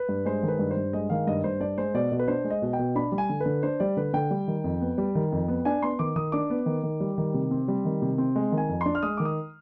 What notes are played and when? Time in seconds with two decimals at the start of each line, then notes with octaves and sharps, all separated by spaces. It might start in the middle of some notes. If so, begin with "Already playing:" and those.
Already playing: B4
0.09 G2
0.25 G#3 C5
0.43 D#3
0.48 B4
0.59 G2
0.71 C5
0.76 G2
0.93 G#3 D#5
1.10 D#3 F5
1.27 G2 D#5
1.44 G2 C5
1.60 D4 D5
1.78 G#3 C5
1.94 B2 D5
2.12 B2
2.19 B4
2.28 D4 C5
2.44 G#3
2.51 D#5
2.62 B2
2.73 G5
2.79 B2
2.95 D4 B5
3.12 G3
3.18 G#5
3.29 D3
3.40 B4
3.46 D3
3.63 D4 C5
3.80 G3 D5
3.97 D3 B4
4.14 D3 G5
4.31 G3
4.48 D#3
4.64 F2
4.81 B3
4.98 G3
5.15 D#3
5.32 F2
5.48 B3
5.65 D4 G#5
5.82 B3 C6
5.99 D#3 D6
6.16 D#3 D#6
6.32 D4 D6
6.50 B3
6.66 D#3
6.83 D#3
7.00 G3
7.18 D#3
7.34 C3
7.51 C4
7.68 G3
7.85 D#3
8.02 C3
8.18 C4
8.36 G#3
8.52 D#3
8.58 G#5
8.69 F2
8.81 D4 C6
8.95 F6
9.03 G#3 D#6
9.17 D#3 D6
9.25 D#6